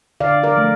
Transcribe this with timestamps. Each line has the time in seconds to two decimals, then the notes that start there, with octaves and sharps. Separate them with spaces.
0.20 D3 D5 F5
0.43 A#4 D5
0.56 F3 A3